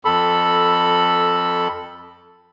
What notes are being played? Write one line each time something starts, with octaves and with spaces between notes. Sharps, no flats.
F2 A4 B5